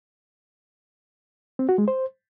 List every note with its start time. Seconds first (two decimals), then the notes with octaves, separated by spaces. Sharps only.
1.59 C4
1.69 F#4
1.78 G#3
1.88 C5